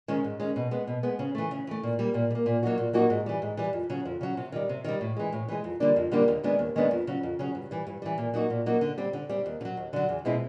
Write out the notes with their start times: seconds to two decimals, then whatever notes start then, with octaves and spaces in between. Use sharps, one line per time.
0.08 D#3 G#3 C#4
0.24 G#2
0.40 D#3 G#3 C#4
0.56 B2
0.71 G#3 B3
0.87 B2
1.03 G#3 B3
1.19 C#3
1.35 E3 A3
1.51 C#3
1.67 E3 A3
1.83 A#2
1.99 G3 A#3
2.14 A#2
2.30 G3
2.35 A#3
2.46 A#2
2.63 F#3 A#3 D#4 F#4
2.78 A#2
2.93 F#3 A#3 D#4 F#4
3.10 G#2
3.26 E3 G3
3.42 G#2
3.57 E3 G3
3.73 F2
3.90 C#3 F#3
4.05 F2
4.21 C#3 F#3
4.37 C3
4.52 D#3 G3
4.69 C3
4.84 D#3 G3
5.01 A2
5.17 E3 G#3
5.32 A2
5.49 E3 G#3
5.64 F2
5.80 D3 G3 A#3 D4
5.96 F2
6.11 D3 G3 A#3 D4
6.28 D#2
6.44 D#3 G#3 B3 D4
6.59 D#2
6.76 D#3 G#3 B3 D4
6.91 F2
7.07 C#3 F#3
7.23 F2
7.39 C#3 F#3
7.55 G2
7.71 E3 G3
7.87 G2
8.02 E3 G3
8.18 A#2
8.34 F#3 A#3 D#4 F#4
8.50 A#2
8.66 F#3 A#3 D#4 F#4
8.81 D3
8.98 G3 C4
9.13 D3
9.29 G3 C4
9.46 D#2
9.61 D3
9.65 F#3
9.77 D#2
9.93 D3 F#3
10.09 E2
10.25 B2 G#3 C4 E4